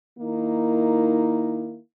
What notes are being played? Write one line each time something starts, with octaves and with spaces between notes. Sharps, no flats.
D#3 A#3 D#4 E4